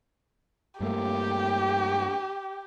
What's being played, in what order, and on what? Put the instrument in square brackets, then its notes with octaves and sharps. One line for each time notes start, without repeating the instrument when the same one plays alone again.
[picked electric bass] G2 A3 A#3 [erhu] G4